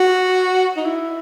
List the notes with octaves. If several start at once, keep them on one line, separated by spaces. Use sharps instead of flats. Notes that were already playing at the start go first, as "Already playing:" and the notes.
Already playing: F#4
D#4
E4